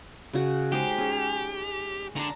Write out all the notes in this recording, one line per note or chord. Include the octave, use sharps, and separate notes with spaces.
C#3 F#4
G#3 D#4 G4 C5
C#4 G#4
D3 D4 A5 A#5